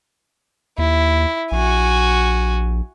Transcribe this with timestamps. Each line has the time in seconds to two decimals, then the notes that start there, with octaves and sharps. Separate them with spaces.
0.78 D#2 E4
1.52 A#1 F#4 G#5